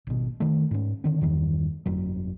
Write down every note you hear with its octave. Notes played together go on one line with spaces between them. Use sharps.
G#1 B2
D#3 A3
G#2 C#4
D3 D#3 C4
E2 G2 D#3
G1 F2 F#3